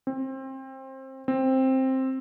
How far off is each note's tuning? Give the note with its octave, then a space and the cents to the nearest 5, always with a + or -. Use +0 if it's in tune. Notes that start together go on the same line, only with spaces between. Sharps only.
C4 +25
C4 +10